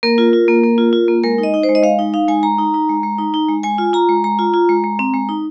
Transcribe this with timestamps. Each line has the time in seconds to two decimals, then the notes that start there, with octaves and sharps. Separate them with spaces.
0.03 A#3 A#4
0.18 F4
0.33 F4
0.48 A#3
0.63 A#3
0.78 F4
0.93 F4
1.08 A#3
1.23 G#3 A#4
1.38 D#4
1.43 D#5
1.54 D#4
1.63 C5
1.69 G#3
1.75 D#5
1.83 G#3 F5
1.99 D#4
2.14 D#4 F5
2.28 G#3 G#5
2.43 G#3 A#5
2.58 D#4
2.74 D#4
2.89 G#3
3.03 G#3
3.19 D#4
3.34 D#4
3.49 G#3
3.63 G#3 G#5
3.78 F4
3.93 F4 A#5
4.09 G#3
4.24 G#3 A#5
4.39 F4
4.54 F4
4.69 G#3
4.84 G#3
4.99 C4
5.14 G#3
5.29 D#4